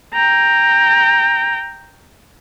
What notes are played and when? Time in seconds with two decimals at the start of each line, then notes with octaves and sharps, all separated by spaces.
0.14 G5 A#5